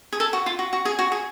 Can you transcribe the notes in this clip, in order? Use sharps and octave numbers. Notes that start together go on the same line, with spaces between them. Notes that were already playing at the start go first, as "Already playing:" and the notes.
G#4
A4
F#4
F4
F#4
F#4
G#4
F#4
G#4